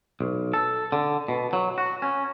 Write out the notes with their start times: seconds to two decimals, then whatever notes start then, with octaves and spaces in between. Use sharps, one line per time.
0.21 B1
0.54 A4
0.92 D3
1.28 B2
1.53 F#3
1.78 F#4
2.02 C#4